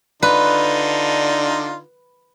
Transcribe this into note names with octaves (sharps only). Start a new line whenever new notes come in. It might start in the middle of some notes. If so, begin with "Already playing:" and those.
D3 D4 D#4 F4 B4